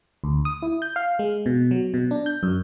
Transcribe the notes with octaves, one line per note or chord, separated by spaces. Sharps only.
D2
D#6
E4
G6
F5
G#3
B2
F#3
B2
D4
G6
F#2